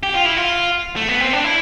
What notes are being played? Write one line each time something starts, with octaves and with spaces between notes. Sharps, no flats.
G4
F4
E4
F4
A3
B3
C4
D4
E4